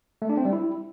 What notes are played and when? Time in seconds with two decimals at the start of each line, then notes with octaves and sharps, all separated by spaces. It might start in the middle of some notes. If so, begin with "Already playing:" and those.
0.22 A3
0.29 D4
0.37 C4
0.45 G3
0.53 E4